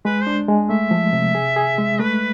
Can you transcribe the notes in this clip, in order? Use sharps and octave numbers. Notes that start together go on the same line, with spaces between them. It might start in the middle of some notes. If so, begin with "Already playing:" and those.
G#3 B4
C5
D4
G#3
A3 E5
F3
C3
G#4
G#4
G#3
A3 B4